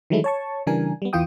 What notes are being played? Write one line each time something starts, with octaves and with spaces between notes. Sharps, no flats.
D#3 E3 F#3 G#3 A3 E4
C#5 A5 C#6
C#3 E3 G3 D4 A#4 G#5
G3 B3
E2 E3 F4 G5 D#6